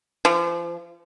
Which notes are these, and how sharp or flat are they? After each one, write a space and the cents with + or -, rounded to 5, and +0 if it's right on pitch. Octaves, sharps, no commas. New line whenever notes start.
F3 -35